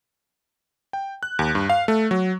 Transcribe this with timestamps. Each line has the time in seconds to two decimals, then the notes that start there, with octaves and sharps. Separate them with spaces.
0.93 G5
1.23 F#6
1.39 D#2
1.55 G2
1.70 F5
1.88 A3
2.11 F#3